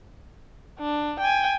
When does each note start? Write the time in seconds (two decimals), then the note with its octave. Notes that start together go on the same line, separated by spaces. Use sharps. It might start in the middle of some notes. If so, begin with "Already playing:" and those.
0.79 D4
1.20 G5 G#5